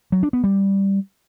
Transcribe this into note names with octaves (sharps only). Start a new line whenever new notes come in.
F#3
D4
B3
G3